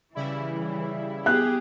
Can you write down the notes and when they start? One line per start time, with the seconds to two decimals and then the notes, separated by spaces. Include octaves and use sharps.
0.15 C#3 E3 G3 E4
1.26 B3 G4 G#4 F#6